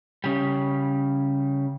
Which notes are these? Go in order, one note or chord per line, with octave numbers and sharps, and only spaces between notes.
C#3 G3